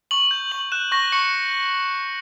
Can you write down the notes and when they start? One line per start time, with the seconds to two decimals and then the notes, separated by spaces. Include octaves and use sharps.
0.11 C#6 F#7
0.31 G6
0.52 C#6 F#7
0.72 F#6 E7
0.92 C#6 A#6
1.12 C#6 C#7